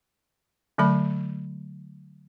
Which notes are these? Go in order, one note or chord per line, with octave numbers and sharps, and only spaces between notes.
D3 F#3 A3 B5